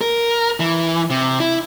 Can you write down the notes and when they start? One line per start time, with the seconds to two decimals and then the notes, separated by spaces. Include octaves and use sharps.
0.01 A#4
0.60 E3
1.10 C3
1.40 E4